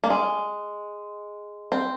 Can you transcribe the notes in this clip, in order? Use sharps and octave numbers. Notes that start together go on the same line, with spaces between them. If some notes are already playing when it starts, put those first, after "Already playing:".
A#3
G#3
C4